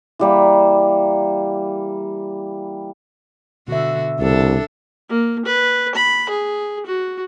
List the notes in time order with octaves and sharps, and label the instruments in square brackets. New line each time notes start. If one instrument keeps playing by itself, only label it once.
[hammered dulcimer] E3 G3 A#3
[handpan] B2 E5 [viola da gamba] D3 F#4
[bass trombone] C2 [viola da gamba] D4 A4
[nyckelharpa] A#3
B4
B5
G#4
F#4